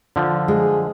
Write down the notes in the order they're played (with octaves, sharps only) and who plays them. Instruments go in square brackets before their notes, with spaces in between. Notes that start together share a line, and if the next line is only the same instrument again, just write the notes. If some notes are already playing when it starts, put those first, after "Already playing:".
[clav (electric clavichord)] D3 F3
[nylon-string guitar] G#3 [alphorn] G#4